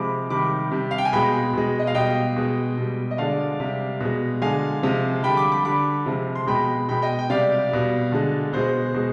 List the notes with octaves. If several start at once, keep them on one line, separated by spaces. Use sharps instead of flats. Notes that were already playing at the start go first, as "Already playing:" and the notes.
Already playing: C3 F3 G#3 B5 D6
C3 D#3 G3 B5 D6
C3 G3
F5
G5
G#5
B2 G#3 G5 B5
B2 G#3
D#5
F5
B2 G3 D#5 G5
B2 G#3
B2 G3
D#5
D3 G#3 D5 F5
C3 G3
B2 G#3
D3 G#3 F5 G#5
C3 F3 G#3
D3 G3 G5 B5
B5 D6
B5 D6
D3 G3 B5 D6
C3 F3 G#3
C6
B2 G#3 G5 B5
B2 G#3 G5 B5
D#5 G5
G5
C3 G3 D5 F5
B2 G3
D3 G#3
B2 G#3 C5
B2 G#3